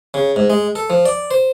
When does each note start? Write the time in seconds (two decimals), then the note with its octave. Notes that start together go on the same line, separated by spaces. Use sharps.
0.14 C#3
0.36 G#2
0.50 G#3
0.75 A4
0.90 F3
1.06 D5
1.31 C5